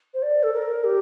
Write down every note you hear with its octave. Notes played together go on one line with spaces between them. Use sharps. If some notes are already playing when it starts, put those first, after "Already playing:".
C5
D5
A4
A#4
G4